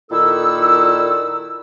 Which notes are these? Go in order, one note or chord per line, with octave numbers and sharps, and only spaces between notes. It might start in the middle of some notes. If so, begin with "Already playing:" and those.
A#2 D#3 E4 A4 E6